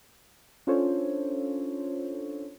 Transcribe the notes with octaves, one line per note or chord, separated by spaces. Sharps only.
C#4 D4 F4 A4 C5 C#5